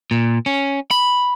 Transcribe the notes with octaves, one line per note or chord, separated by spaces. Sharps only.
A#2
C#4
B5